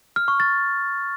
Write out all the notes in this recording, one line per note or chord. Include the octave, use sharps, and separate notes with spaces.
F6
C#6
A6